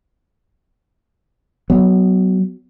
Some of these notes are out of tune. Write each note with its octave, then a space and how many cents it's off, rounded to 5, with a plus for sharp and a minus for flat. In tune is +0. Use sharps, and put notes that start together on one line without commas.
F#3 +20 B3 +0